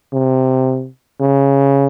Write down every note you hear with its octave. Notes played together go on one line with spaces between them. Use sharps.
C3
C#3